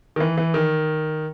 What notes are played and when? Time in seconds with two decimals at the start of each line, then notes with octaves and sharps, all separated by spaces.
0.16 D#3
0.20 E3
0.37 E3
0.54 D#3